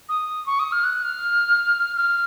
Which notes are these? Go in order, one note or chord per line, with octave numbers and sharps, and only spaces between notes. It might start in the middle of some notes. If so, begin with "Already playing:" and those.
D#6
C#6
D#6
F6
F#6
F6
F6